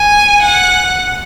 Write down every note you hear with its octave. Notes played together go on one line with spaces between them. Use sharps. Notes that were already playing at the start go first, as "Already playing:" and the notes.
Already playing: G#5
F#5